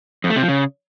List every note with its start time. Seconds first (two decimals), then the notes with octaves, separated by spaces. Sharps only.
0.24 F2
0.30 A3
0.36 C3
0.42 F3
0.49 C#3